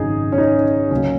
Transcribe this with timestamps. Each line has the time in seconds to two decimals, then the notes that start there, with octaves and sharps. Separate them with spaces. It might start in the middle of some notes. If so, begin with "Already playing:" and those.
Already playing: G#1 F#2 C#3 F#3 D#4 G#4
0.32 C#4
0.38 D#4
0.91 C#2 C#3 F#3 A#3 C#4